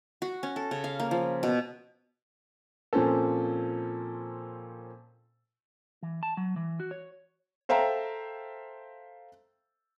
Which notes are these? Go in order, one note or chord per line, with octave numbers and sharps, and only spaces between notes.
F#4
C#4
A4
C#3
F5
A#3
F3
B2
A#2 F3 C4 C#4 A4
E3
A5
F#3
E3
F#4
C#5
A4 C5 E5 F5 G5 A#5